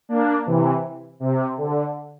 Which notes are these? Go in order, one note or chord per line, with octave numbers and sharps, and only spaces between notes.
A#3 D4
C3 E3
C3
D3